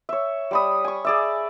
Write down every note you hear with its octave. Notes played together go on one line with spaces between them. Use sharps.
C#5 E5
G3 B5 D#6
G#5 C#6
G#4 D5 E5